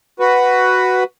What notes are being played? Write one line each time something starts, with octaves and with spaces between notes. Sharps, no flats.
F#4 B4